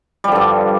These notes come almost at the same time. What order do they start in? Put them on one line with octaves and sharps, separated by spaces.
G3 F3 D3 G2